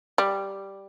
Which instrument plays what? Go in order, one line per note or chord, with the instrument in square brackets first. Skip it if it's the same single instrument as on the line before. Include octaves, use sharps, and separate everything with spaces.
[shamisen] G3